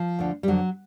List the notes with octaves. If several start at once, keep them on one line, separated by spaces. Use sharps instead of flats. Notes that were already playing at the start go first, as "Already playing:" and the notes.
Already playing: F3
D2 D3
G3
F2 D3 F#3